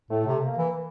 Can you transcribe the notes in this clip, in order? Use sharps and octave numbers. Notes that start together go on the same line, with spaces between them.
A2 A3
C3
A#3
E3